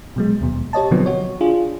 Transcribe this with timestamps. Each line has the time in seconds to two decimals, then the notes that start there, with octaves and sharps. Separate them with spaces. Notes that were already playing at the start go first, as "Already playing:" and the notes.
0.16 B2 F#3 G#3
0.41 D#2 B2
0.73 G4 C#5 D#5 A5
0.91 B2 D3 F3 F#3 B3 C4
1.06 F#4 C#5
1.41 D4 F4 G#4